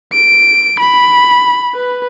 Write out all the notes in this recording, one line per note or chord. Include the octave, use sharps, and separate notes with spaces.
D7
B5
B4